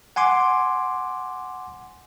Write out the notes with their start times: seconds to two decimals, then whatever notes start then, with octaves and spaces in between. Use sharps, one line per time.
0.16 F#5 G#5 C6 D6